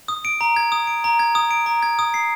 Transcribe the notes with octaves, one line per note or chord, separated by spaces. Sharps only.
D#6
D7
A#5
G#6
D#6
D7
A#5
G#6
D#6
D7
A#5
G#6
D#6
C7